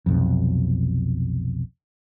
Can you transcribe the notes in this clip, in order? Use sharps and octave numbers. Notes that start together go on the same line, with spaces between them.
F1 B1 F2